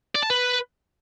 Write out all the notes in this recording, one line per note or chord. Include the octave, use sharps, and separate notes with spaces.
D5
A5
B4